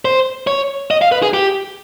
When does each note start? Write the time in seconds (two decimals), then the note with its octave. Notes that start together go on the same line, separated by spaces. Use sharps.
0.05 C5
0.47 C#5
0.91 D#5
1.02 F5
1.12 B4
1.22 G#4
1.34 G4